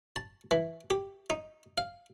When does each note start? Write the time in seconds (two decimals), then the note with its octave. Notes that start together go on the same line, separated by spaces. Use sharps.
0.16 A5
0.51 E3
0.90 G4
1.30 D#4
1.78 F5